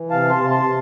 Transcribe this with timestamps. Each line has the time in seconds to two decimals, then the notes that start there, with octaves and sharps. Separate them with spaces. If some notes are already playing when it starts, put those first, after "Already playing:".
Already playing: E3
0.10 C3 F5 A5
0.30 A5 C6
0.37 C3
0.50 A5 C6
0.64 C3